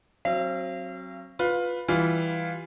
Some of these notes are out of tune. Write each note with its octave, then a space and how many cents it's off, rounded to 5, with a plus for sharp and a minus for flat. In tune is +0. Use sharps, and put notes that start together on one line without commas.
F#3 +0 C4 +30 F5 -35
F4 +15 B4 +0
E3 +0 G3 +0 F4 +0